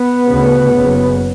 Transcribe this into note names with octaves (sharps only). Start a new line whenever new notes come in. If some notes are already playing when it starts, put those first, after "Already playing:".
Already playing: B3
D2 C#3
F#1 F#2 C#3